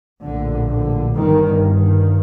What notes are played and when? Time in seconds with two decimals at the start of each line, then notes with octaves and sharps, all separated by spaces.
0.22 A#1 A2 D3
0.69 D3
1.15 G1 G2 D#3
1.61 D#3